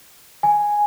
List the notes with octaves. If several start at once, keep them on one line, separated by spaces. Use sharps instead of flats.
G#5